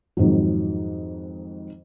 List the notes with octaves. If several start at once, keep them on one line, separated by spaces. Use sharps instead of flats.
F2 G#2 D#3 F#3